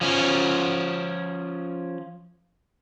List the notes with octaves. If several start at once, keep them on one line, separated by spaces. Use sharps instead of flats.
F3 C#4